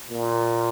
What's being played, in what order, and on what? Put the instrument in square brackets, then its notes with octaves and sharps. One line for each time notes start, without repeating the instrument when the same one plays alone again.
[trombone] A#2